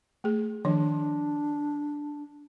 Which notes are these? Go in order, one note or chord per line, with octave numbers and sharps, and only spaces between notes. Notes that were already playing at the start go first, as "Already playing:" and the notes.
A3 G#4
D#3 F3 D4 C#5